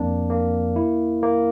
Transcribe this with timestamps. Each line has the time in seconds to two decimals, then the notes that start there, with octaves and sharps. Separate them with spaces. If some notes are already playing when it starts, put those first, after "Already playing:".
Already playing: F2 A#3 D4
0.30 A#3
0.76 E4
1.23 A#3